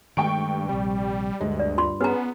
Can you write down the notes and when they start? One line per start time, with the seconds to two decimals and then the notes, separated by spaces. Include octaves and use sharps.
0.17 G2 D#3 G#3 A3 G5 C#6 D7
0.69 A#1 C3 G3
1.41 D2 G2 G#3
1.60 D5
1.78 F4 C6
2.01 B3 C#4 G#4 B4 A#5